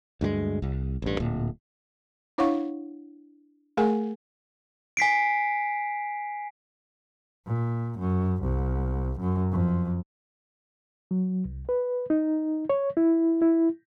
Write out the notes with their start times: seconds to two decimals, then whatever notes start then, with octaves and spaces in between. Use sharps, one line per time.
0.21 D2 G2 F#3 G#3
0.62 C2
1.02 A1 G2
1.20 D1 A#2
2.38 D4 E4 C#5 F5 F#5 C#6
3.77 A3 G#4 A#4 F#5 G#5
4.97 G#5 B6 C7 D7
7.46 A#2
7.99 F#2
8.43 C2
9.20 F#2
9.51 F2
11.11 F#3
11.45 C2
11.69 B4
12.10 D#4
12.69 C#5
12.97 E4
13.42 E4